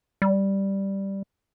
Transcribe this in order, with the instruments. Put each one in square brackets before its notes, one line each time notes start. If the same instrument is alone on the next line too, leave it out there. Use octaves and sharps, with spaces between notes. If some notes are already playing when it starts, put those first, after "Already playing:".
[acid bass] G3